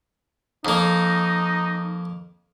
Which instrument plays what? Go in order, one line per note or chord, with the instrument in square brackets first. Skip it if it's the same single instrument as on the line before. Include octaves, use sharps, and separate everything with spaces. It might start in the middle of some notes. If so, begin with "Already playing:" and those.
[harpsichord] F2 A#3 [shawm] D#4